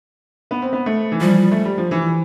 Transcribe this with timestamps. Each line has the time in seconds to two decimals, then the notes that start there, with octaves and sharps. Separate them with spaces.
0.51 B3
0.62 C4
0.73 B3
0.86 A3
1.12 E3
1.21 F3 G3
1.51 A3
1.65 G3
1.78 F3
1.91 E3